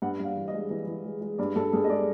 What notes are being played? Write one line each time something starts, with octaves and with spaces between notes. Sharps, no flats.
G2 F#5
G2
F5
E3
D#5
G#3
E3
E3
G#3
G#3
G2 D5
G2 A4
G2 G#4
D#5
G#3 D5